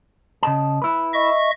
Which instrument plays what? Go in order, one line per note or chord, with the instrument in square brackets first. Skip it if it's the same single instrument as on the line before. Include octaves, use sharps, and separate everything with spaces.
[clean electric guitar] C#3 D#5 A5
E4 B4
[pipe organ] D#5 E5 C#6